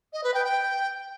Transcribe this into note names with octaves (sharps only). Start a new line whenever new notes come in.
D#5
B4
G5
G5